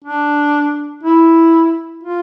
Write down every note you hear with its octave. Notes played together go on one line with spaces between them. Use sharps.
D4
E4
F4